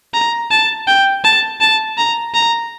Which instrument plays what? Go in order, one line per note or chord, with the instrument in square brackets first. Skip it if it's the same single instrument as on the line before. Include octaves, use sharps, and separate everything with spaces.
[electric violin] A#5
A5
G5
A5
A5
A#5
A#5